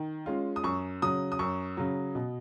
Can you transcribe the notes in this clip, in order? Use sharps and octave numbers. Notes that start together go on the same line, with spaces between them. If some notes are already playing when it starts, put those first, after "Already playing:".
Already playing: D#3
G#3 C#4 F4
D#6
F#2 C#6
C#3 F#3 D#6
D#6
F#2 C#6
C#3 F#3
B2